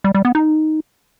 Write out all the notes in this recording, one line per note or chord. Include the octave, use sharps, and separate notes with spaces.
G3
G3
B3
D#4